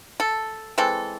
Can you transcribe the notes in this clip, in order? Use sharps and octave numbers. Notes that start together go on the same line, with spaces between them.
A4
E3 G#3 C4 A4